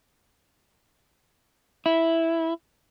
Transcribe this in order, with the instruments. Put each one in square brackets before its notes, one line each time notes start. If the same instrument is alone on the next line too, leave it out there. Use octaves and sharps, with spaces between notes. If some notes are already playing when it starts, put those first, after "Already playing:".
[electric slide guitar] E4